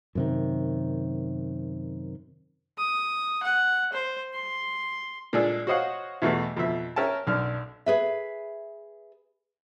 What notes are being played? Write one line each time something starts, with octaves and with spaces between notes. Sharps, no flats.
F#2 C3 D#3
D#6
F#5
C5
C6
A#2 G#3 D4 G#4 A4
F#4 C5 C#5 D#5 F5 F#5
E2 B2 E3 A3
F2 B2 E5
C#4 A#4 E5 G5 A5
B1 F#2 D4 F6
G#4 B4 E5